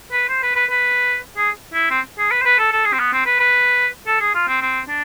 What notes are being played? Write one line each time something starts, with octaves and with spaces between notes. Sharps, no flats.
B4
C5
B4
B4
B4
G#4
E4
C4
G#4
B4
C5
B4
A4
A4
G#4
C4
B3
C4
B4
B4
A4
G#4
F4
C4
C4
D4